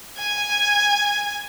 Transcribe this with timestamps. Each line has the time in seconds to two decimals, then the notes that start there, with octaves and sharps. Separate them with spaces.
0.18 G#5